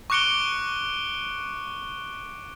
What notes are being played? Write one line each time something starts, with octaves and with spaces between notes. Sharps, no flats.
C#6 D6 F#6 C#7 D7 G7